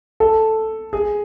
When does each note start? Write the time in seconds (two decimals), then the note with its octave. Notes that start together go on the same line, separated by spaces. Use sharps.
0.20 A4
0.93 G#4